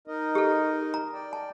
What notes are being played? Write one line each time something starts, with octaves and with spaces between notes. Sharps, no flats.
D#4 A#4 D#5
G4 A4
A#5
D5 G5
A5